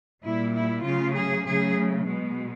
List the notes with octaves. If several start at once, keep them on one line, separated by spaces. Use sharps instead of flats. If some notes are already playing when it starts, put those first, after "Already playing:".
A#2 G3 E4
E4
C#3 F#3 A3 F4
G#4
C#3 F#3 A3 G#4
B2 G#3